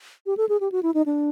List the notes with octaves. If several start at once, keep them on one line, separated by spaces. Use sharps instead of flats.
G4
A4
G#4
G4
F#4
E4
D#4
D4